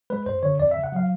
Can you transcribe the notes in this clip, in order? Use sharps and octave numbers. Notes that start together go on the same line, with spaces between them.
G#3 B4
F#2 C5
D3 C#5
F2 D5
E5
C#3
F#5
F#3 F5